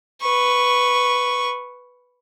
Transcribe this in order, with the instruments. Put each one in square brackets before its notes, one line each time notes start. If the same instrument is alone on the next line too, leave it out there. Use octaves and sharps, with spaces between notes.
[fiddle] B4 C#6